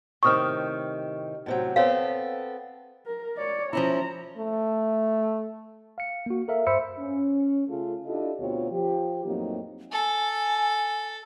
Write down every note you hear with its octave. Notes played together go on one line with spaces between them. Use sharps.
A2 C3 D#3 C#6 D#6 F6
A2 C3 F#3
B3 C4 A4 C#5 F5
A#4
C#5 D5
F3 C#4 E4 A#5
A3
F5 C#7
A#3 F#4
A4 A#4 E5 F5
G2 C5 E5 B5 E6 C#7
C#4
C#3 A3 F4 G#4 A4
D4 E4 F4 G4 A4 D#5
D2 B2 C4 F4 G4 C#5
F3 G4
F2 A2 F#3 A#3 C4 D#4
A4 G#5